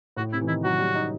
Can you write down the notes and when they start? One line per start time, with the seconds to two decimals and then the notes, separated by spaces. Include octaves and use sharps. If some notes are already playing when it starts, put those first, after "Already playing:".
0.17 A2 F#4
0.33 C3 E4
0.41 E3
0.48 D#3 E4
0.64 F#3 F#4
0.79 G3
0.95 D#4